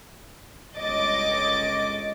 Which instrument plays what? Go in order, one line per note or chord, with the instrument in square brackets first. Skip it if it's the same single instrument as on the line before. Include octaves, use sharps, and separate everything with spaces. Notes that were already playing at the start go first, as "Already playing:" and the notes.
[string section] G1 C#2 C#5 D#5 D6 A6